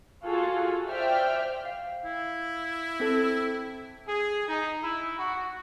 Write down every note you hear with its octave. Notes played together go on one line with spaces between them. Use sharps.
F4 F#4 G#4 A4
C5 D5 E5 G5 F6
F5
E4
C4 A4
G#4
D#4
E4
F#4